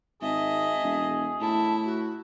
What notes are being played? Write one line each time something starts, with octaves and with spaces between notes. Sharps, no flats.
G#1 G#4 D#5 E5 A5
E1
A2 E4 A5
F#4